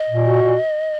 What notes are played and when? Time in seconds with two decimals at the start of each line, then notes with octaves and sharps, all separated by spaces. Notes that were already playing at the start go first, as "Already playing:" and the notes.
Already playing: D#5
0.09 A#2
0.26 F#4
0.42 A#2